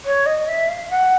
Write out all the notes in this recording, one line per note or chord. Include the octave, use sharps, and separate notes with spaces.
C#5
D#5
E5
F5
F#5